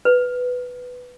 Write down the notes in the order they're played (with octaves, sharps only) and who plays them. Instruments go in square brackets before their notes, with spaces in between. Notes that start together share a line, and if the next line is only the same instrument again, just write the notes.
[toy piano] B4